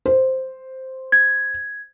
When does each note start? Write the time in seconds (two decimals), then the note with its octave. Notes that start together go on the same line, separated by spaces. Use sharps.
0.06 C5
1.12 G#6